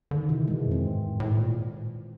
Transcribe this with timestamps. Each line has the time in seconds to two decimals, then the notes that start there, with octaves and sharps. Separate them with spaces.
0.11 D3 D#3
0.29 C3 E3
0.47 B2 G#3
0.66 F2
0.71 C4
0.84 G#2
1.02 A2
1.20 A2
1.38 A#2